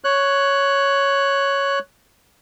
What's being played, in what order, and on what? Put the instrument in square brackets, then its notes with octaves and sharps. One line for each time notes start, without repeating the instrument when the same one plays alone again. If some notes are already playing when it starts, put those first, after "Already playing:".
[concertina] C#5 F#6